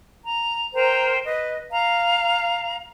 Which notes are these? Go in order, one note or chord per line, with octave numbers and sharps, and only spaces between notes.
A#5
A#4 C5 G5 A#5
B4 D#5
F5 A#5